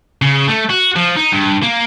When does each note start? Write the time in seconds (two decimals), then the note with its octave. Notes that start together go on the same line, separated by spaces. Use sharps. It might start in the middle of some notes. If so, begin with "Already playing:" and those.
0.22 C#3
0.48 A3
0.70 F#4
0.96 F3
1.17 D#4
1.33 G2
1.63 A#3